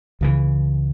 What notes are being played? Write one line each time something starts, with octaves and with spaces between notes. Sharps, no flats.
C#2 C#3 E3